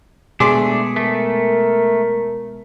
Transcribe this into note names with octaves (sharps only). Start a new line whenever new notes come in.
B2 G#3 A3 B3 D4 G#4 C6 D6
A3 A#4